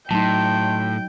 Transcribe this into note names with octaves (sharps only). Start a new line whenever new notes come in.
A2 F#3 D#4 G5 A5 C6